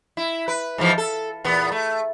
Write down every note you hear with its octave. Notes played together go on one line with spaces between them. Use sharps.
E4
B4
G#2 E3 F3
A4
E2 A#2 B3
A3